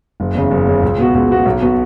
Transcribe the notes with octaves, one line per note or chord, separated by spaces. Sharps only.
F#1
E2 C#3
F#1
E2 C#3
C#2
B2 B3 F#4
C#2
B2 B3 F#4
B1
B2 B3 F#4